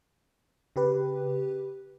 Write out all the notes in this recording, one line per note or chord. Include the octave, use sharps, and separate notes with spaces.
C#3 G4 B4